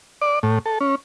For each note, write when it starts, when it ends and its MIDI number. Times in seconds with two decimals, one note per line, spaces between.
0.21 0.39 74
0.43 0.59 45
0.66 0.79 69
0.80 0.95 61